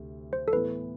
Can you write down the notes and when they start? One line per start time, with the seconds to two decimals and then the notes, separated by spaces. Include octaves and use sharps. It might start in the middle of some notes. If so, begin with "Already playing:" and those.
Already playing: D2 C3
0.33 C5
0.48 A4
0.53 A2 E3 B3 B4